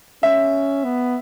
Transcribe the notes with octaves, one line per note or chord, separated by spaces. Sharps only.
C#4 E5
B3